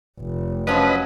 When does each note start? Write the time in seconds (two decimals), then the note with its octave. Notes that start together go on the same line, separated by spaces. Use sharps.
0.20 F1
0.67 F3 F#3 C#4 B4 D#5